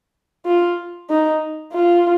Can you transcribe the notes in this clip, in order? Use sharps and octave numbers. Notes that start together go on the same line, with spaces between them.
F4
D#4
F4